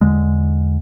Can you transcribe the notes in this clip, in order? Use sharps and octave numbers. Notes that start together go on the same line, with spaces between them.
E2 D3 G#3